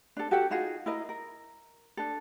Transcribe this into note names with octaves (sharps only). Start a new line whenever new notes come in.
D4 A4
F#4 G4 A4 F#5
D#4 F4 F#4 G#4
E4 A#4 D#5
A#4
D4 A4